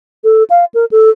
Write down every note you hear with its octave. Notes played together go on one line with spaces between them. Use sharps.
A4
F5
A#4
A4